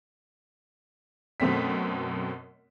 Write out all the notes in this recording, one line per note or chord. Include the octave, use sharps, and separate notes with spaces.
F#2 B2 A3 C4 B6